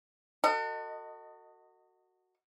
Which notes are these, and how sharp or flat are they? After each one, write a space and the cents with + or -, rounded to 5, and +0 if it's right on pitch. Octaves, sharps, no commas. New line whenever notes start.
F#4 +0 A4 +40 D#5 -10